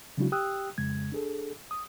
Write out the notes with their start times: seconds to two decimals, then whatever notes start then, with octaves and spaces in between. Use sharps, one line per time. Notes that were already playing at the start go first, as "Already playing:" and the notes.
0.18 C#3 F#3 G#3 D4 E4 F#4
0.32 G4 G5 D#6 E6 F#6
0.78 F2 C#3 G#3 G#6
1.12 D4 G#4 A4
1.71 D#6